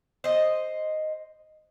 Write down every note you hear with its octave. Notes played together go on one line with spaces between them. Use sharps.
C5 D#5